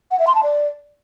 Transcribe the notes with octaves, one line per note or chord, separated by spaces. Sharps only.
F#5
E5
C6
A5
D5